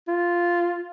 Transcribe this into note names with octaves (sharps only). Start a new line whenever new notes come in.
F4